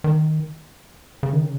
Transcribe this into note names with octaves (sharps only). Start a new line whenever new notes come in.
D#3
C#3
D#3
C#3